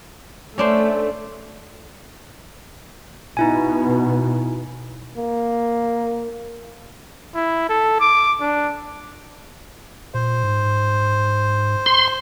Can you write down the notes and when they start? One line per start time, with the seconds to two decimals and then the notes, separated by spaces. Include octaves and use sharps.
0.58 A3 C#4 D4 C5
3.37 B2 D#4 E4 G#5
5.17 A#3
7.35 E4
7.70 A4
8.00 D6
8.41 D4
10.14 A#2 C5
10.44 G#2
11.86 C6